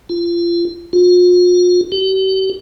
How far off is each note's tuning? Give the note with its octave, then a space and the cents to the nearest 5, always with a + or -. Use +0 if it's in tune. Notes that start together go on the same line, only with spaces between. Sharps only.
F4 -30
F4 +40
G4 -45